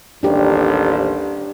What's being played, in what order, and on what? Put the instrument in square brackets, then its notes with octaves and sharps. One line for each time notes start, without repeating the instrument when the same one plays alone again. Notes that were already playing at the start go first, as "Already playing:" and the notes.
[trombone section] A1 D#2 A2 [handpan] D4 G4